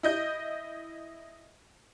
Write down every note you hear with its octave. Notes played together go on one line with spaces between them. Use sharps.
E4 D#5 G6